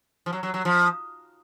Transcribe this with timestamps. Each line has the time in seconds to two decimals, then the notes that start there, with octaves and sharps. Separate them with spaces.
0.26 F3
0.33 F#3
0.43 F#3
0.54 F#3
0.65 F3